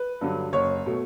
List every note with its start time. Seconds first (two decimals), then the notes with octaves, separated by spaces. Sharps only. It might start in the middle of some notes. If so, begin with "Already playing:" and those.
Already playing: B4
0.21 G2 D3 F#3
0.53 F#1 C#5
0.86 B2 A3